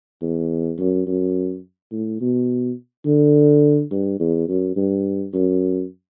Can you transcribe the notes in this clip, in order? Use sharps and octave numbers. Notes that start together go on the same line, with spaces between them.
E2
F#2
F#2
A2
B2
D3
G2
E2
F#2
G2
F#2